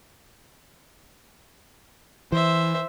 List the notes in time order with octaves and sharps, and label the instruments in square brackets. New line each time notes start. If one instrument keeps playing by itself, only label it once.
[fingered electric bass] E3 [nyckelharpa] C5 E5